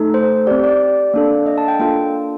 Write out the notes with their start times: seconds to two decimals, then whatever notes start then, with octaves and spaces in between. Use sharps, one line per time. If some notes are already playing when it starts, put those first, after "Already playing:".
Already playing: A3 D#4 A4
0.14 C5
0.47 C4 G4 D5
0.64 D5
1.14 A#3 D4 A4
1.46 D#5
1.58 A5
1.68 G5
1.79 A#3 D4 F4 A4 G5